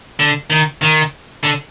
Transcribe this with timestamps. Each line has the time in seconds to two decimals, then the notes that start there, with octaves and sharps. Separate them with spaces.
0.19 D3
0.50 D#3
0.82 D#3
1.43 D3